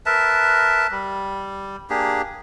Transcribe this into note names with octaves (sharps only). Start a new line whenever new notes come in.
A#4 B4 E5 A5
G3
A#3 D4 G4 G#4